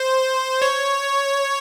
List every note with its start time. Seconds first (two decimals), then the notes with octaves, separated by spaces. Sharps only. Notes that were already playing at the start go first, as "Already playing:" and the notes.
Already playing: C5
0.62 C#5